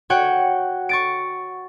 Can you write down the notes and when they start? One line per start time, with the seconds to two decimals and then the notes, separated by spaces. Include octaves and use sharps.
0.10 F#4 C#5 F#5 G5
0.89 C#6 A6 D7